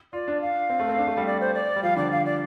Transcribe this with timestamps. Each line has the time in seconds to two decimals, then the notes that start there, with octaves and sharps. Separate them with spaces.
0.13 F4 D5
0.28 D4
0.41 F5
0.70 C4
0.79 A3
0.89 C4
0.98 D4
1.07 A3
1.17 G3
1.26 D5
1.40 C5
1.54 D5
1.76 G3
1.83 F3 F5
1.97 D3 D5
2.11 F5
2.25 D5